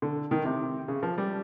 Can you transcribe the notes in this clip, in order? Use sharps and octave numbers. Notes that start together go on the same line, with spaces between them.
D3
D#3
C3
C#3
F3
G3